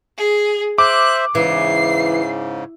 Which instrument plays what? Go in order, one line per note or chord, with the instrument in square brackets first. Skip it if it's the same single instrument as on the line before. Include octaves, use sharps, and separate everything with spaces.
[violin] G#4
[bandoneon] C5 E5 [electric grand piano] D6 [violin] F#6
[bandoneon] G#2 C#3 [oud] E3 [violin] C7